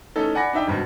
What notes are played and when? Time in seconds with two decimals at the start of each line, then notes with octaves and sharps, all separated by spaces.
0.16 E3 A3 C#4 D#4 A4
0.35 D5 F#5 G#5 B5 A#6
0.53 D4 D#4 E5 G5
0.68 G#1 G2 B2